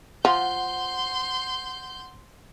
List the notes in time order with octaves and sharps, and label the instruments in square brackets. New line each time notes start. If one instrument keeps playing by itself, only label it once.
[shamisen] F3 [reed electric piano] F#5 [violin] C6 G6